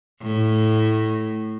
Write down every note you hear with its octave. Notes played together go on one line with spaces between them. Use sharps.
A2